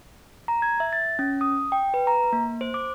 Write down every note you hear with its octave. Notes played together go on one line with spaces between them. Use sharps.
A#5
G#6
E5
A6
C#4
D#6
G5
B4
A#5
A#3
C5
D6